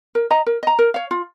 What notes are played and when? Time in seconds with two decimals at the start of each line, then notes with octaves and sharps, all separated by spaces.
0.15 A#4
0.31 D#5 A#5
0.46 A#4
0.63 D#5 A#5
0.79 A#4
0.94 C#5 F5
1.11 F4